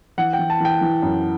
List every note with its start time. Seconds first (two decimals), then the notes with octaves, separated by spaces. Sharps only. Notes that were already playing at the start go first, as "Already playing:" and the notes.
0.18 E3 F#5
0.33 G5
0.38 E3
0.50 A5
0.60 E3 G5
0.81 E3
1.02 F#2